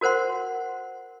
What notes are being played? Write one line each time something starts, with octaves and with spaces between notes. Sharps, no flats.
F#4 A#4 C5 F#5 C6